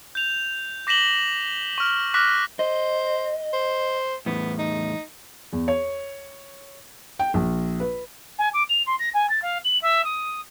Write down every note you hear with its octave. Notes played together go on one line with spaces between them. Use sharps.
G6 F7
D6 A#6 B6 E7 F#7 G7
C#6 F6
D6 F6 F#6 A#6 B6
C5 D#5
C5
E2 A2 B3
D#4
E2
C#5
G5
A#1
B4
G#5
D6
F7
C6
A#6
G#5
A6
F5
F#7
E5
D#6